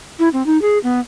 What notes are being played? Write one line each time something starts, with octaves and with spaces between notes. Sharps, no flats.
E4
C4
D#4
G#4
B3